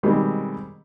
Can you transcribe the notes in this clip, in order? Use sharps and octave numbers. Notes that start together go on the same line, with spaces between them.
B2 D#3 G3 G#3 C4